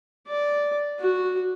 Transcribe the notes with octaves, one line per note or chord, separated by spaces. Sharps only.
D5
F#4